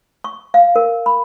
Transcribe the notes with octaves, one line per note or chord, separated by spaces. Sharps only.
C#6
F5
A#4
B5